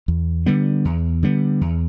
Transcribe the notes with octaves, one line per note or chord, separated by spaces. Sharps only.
E2
D3 G3 B3
E2
D3 G3 B3
E2